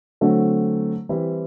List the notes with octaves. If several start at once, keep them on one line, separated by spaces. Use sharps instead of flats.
D3 F#3 A3 C4
E3 G3 C4 E4